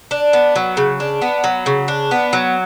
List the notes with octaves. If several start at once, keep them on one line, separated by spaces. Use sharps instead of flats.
D4
B3
F#3
C#3
D4
B3
F#3
C#3
D4
B3
F#3